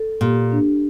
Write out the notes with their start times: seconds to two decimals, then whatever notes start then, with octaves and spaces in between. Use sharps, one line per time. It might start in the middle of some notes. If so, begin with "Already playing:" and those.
Already playing: A4
0.21 A#2 G4
0.52 D4